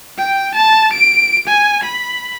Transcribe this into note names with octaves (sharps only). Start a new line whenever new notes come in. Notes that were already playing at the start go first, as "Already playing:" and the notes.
G5
A5
D7
G#5
B5